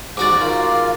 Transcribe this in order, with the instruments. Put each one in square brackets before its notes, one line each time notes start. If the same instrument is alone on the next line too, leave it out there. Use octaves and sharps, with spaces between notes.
[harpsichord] G#2 F#4 D5 [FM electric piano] D6 A6
[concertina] F4 A#4 F6 [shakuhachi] F5